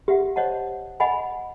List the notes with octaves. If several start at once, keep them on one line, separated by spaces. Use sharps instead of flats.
G4 E5 F#5
C5 C#5 D#5 F#5 A5
D#5 F#5 G#5 B5